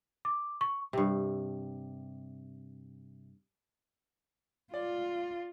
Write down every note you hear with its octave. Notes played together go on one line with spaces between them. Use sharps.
D6
C#6
G2 C3
F4 D5